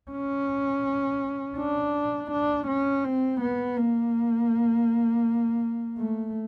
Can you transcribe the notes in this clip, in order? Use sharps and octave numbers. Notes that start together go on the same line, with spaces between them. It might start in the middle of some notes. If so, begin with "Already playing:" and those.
C#4
D4
D4
C#4
C4
B3
A#3
A3